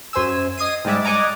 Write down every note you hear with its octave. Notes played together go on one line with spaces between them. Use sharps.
F#2 C5 G#5 E6
D#5 D#6 G#6 C7 D#7
G#2 G3 G#3 D5 E5
D5 D#5 F#5 G#5 A#5 D6